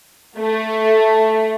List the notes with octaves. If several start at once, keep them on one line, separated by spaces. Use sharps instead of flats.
A3